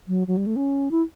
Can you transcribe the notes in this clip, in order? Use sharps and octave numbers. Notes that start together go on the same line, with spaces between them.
F#3
F#3
G3
A3
C#4
E4